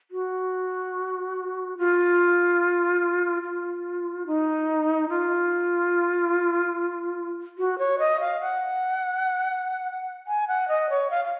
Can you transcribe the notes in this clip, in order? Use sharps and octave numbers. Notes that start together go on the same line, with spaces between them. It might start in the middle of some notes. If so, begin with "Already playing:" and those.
F#4
F4
F4
D#4
F4
F#4
C#5
D#5
F5
F#5
G#5
F#5
D#5
C#5
F5
F5